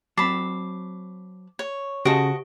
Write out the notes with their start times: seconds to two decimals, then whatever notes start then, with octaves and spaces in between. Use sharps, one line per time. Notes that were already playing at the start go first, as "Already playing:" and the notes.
0.18 F#3 C4 A5 B5 D6 C7
1.59 C#5
2.05 C#3 F#4 G4 C5 D#5 F#5 A5 D7